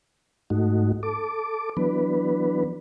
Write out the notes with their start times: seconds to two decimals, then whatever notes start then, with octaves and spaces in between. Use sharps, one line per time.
0.50 G#2 A3 D#4 F#4
1.03 A4 D6
1.77 E3 F#3 B3 D4 B4